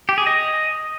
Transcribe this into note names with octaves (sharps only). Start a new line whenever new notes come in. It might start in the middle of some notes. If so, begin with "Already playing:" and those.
G4
G#4
D#5